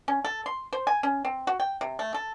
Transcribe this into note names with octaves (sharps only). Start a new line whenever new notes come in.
C#4
A4
C6
C5
G#5
C#4
C4
F#4
G5
C3
A3
A4